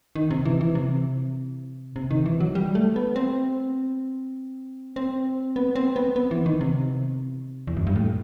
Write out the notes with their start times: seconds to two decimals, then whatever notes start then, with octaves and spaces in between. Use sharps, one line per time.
0.15 D#3
0.31 C3
0.45 E3
0.61 E3
0.75 C3
1.96 C3
2.11 D#3
2.26 E3
2.40 F#3
2.55 G3
2.75 A3
2.96 B3
3.16 C4
4.96 C4
5.56 B3
5.76 C4
5.96 B3
6.16 B3
6.31 E3
6.46 D#3
6.61 C3
7.67 E2
7.77 F#2
7.87 G2
7.96 A2